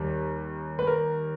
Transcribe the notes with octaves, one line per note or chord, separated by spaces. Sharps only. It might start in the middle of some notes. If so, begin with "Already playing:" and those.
Already playing: D#2 G3
B4
A#4